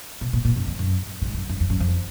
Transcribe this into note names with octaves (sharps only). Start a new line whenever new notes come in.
B2
A#2
A#2
F#2
F2
F#2
A#2
G#2
F2
F#2
F#2
F2
F#2
F2